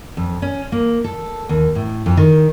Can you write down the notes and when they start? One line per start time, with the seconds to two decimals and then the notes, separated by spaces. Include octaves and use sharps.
0.17 F2
0.42 C#4
0.72 A#3
1.04 A4
1.49 D#2
1.75 A2
2.06 F2
2.17 D#3